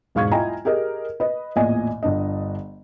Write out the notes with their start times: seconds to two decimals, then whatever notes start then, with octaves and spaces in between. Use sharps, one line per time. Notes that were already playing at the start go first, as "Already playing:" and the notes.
0.15 E1 G#2 F5 C#6 G#6
0.32 E4 F4 D#5 G5 G#5 A#5
0.65 G4 G#4 A#4 D#5
1.20 B4 D#5
1.56 A1 E2 A#2 D5 D#5 G#5
2.03 G1 D4 D#5